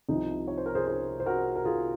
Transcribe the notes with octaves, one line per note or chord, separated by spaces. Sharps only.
C2 C3 F3 D#4
C#5
C5
A#4
G#4 C5
G#4 C5
C5
F#4 A#4
A#4
F4 G#4